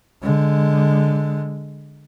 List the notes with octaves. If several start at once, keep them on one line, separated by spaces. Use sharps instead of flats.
D3 G#3